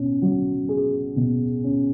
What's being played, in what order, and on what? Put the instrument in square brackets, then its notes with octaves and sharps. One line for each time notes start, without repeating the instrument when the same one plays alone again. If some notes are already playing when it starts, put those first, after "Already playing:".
Already playing: [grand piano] B2 C#4
F#3
G#4
B2
C#4